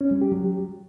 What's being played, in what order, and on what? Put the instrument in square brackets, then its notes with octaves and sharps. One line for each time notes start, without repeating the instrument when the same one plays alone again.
[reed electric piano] C#4
G3
G4
F#3